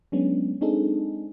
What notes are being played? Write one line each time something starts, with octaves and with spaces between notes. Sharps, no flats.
F#3 G#3 B3 C#4 D4
G#3 C4 D4 D#4 G#4 A4